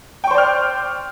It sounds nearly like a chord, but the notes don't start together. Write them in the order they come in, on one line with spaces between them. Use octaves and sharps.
G5 C#6 C5 D5 F6